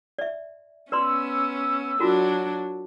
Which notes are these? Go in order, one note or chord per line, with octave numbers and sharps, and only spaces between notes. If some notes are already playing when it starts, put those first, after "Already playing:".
D5 E5
B3 C#4 B4 D5 C6 E6
F#3 D4 F4 F#4 A#4